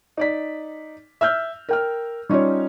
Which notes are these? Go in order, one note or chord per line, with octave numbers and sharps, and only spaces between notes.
D#4 D5 B6
E5 E6 F6 G6
A#4 G5 F6
G3 C#4 D#4 F4 C#5